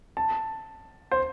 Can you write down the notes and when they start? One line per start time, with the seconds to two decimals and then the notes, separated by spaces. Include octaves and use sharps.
0.17 A5
1.11 C5